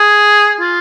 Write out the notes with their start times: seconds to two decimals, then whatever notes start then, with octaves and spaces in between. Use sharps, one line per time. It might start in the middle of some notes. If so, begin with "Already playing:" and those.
Already playing: G#4
0.60 F4